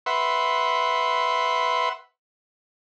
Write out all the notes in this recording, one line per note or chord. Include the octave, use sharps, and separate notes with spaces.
B4 E5 F#5 C6